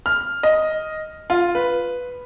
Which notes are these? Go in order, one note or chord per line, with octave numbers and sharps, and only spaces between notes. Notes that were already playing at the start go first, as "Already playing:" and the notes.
F6
D#5
F4
B4